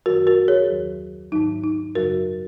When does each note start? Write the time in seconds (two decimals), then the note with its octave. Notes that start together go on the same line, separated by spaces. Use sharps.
0.06 F#2 D#3 F#3 F#4 A#4
0.27 F#4 A#4
0.48 G#4 C#5
0.69 D#2 D#3 F#3
1.32 G#2 D#3 F#3 D#4
1.64 D#4
1.95 F#2 C#3 F#3 F#4 A#4